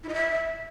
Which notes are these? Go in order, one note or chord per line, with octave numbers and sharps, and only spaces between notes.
E4
D#5
E5